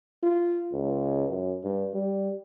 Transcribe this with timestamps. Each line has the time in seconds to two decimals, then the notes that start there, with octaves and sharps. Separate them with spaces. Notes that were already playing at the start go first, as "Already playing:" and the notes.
0.23 F4
0.73 C#2
1.30 F#2
1.64 G2
1.94 G3